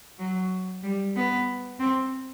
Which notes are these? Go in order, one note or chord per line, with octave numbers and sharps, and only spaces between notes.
F#3
G3
B3
C4